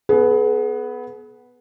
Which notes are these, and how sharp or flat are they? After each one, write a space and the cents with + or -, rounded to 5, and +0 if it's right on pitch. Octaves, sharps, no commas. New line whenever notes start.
B3 +0 G#4 +40 B4 +0